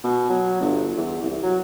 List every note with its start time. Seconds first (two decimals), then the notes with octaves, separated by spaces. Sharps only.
0.04 B2
0.29 F#3
0.61 G1
0.97 E2
1.22 C2
1.43 F#3